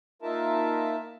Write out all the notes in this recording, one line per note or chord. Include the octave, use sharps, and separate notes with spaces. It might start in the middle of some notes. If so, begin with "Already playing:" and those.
A#3 D#4 F4 A#4 E5 A5